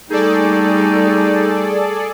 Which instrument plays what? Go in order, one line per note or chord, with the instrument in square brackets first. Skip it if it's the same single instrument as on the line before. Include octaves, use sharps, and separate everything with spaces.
[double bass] G3 A3 [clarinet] D#4 [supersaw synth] G#4 A4 D5